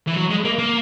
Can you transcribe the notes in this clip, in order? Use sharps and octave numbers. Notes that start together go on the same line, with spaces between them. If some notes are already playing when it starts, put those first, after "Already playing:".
E3
F#3
G#3
A#3
A#3